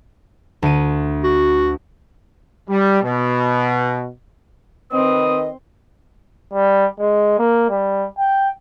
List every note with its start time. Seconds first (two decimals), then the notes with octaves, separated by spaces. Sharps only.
0.62 D2 D#7
1.23 F#4
2.69 G3
3.02 B2
4.92 D#3 C4 B4 D#5 D#6
6.53 G3
6.99 G#3
7.39 A#3
7.70 G3
8.18 G5